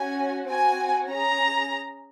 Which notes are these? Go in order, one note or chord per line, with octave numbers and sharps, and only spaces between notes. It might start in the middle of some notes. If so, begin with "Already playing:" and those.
Already playing: C#4 F#4 G#5
C4 F#4 G#5
C#4 G#4 A#5